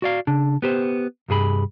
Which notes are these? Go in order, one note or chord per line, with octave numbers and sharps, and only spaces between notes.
F#4 D5 F5
C#3 D4
B3 G4 C5
C2 G2 G#4 B5